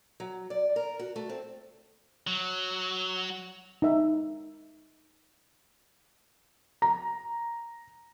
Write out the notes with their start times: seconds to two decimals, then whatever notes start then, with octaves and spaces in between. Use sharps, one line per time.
0.20 F#3
0.50 D5
0.76 A#4
0.99 F#4
1.16 A3
1.29 C4
2.27 F#3
3.82 D#4 E5
6.82 A#5